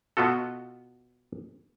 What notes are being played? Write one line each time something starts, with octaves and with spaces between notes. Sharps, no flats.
B2 B3 F4 F#4 A4